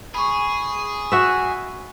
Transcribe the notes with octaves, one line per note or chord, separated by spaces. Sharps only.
G#4 B5 C#6
F#4 E5